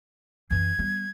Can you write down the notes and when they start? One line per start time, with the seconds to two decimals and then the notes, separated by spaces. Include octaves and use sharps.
0.51 F#2 E3 G#6
0.79 G3 B3